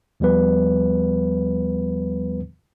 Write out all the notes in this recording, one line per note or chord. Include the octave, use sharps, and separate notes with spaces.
D#2 F3 G3 B3 B4